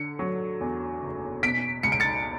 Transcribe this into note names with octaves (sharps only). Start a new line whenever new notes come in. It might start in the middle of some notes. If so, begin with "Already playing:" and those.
Already playing: D3 C#7
F#3
E2
F#1
B2 B6 D7
C#2 C#7
D7
A6 C#7